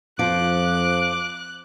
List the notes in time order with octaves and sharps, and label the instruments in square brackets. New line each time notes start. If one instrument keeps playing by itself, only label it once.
[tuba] F2 [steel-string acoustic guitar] F3 [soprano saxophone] D6 [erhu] F#6